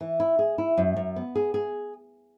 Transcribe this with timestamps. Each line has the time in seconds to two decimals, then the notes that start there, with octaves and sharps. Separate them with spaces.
0.01 E3
0.20 E4
0.39 G#4
0.58 E4
0.78 F#2
0.96 F#2
1.16 B3
1.35 G#4
1.54 G#4